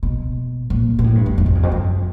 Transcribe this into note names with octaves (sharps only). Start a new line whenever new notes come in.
B2
A#2
A#2
A2
G2
F#2
F#2
F2
E2
F2
F#2